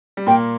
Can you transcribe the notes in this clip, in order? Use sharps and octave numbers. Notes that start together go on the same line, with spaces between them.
G3
A#2 A#3 G5